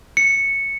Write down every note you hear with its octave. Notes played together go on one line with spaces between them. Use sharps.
C#7